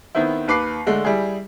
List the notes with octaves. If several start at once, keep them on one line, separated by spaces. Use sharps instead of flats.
D#3 B3 C4 E4
D#2 B4 D6 C7
D3 G#3 A3
G3 E4 G#4